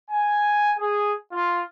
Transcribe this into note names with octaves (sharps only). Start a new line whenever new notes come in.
G#5
G#4
F4